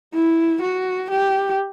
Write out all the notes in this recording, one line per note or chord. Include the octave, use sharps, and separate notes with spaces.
E4
F#4
G4